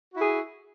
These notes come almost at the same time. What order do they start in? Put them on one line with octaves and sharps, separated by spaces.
F#4 E4 G#4